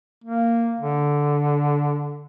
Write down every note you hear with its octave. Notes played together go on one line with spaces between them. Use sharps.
A#3
D3